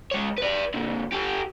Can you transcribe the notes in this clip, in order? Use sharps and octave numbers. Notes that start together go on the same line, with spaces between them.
G#3 C#5
B4 D5
A#2 D3
G4 A4